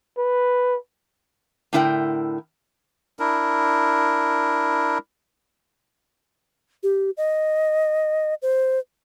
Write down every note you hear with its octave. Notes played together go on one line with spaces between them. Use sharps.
B4
A2 D3 E4 A#4 D5 G5
D4 E4 A#4
G4
D#5
C5